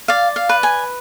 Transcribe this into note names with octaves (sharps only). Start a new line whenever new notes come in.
D5 F5
F5
B4
G#5